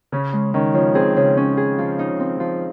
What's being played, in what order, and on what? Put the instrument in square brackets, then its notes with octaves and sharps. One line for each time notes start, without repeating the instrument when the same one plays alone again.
[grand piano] C#3 [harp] C#4
[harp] G#3
[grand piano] D#3 [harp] C#4
[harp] C#3 [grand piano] F3
[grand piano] C4 [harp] G#4
[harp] C#3
C#4
G#4
F3
D#4
C4
F3